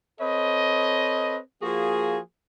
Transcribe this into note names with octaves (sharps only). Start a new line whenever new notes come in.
C4 A4 B4 C#5 D#5
F3 A#3 F#4 G#4